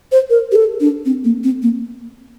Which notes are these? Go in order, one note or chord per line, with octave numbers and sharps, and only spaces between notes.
C5
A#4
G4
A4
D4
C4
A#3
C4
A#3